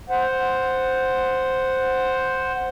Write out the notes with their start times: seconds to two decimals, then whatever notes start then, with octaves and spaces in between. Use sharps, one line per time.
0.09 C5 F#5